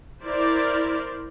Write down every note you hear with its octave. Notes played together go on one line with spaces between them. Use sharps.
E4 A#4 C5 D5